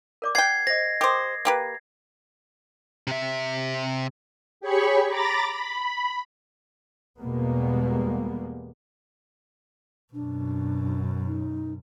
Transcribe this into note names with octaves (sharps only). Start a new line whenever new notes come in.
A#4 D5 D6
F#5 G5 G#6 C7
C5 D#5 A#6
G4 A#4 C5 D6 D#6
A#3 G4 B4
C3 E5
G4 G#4 C#5 B5 C#6
A#5 B5 D6 A6 A#6
B5
E2 B2 G3 G#3 A#3 B3
F#2 B2 D4
D#4